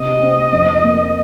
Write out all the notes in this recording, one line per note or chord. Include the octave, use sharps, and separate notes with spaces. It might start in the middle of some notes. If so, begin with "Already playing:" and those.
Already playing: C3 D#5
C4
F2
A#3